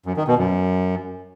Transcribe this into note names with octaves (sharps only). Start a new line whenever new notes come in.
F#2
D#3
B2
F#2